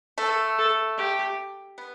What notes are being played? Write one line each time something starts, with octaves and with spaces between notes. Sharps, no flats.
A3 A4
A4
G4
B3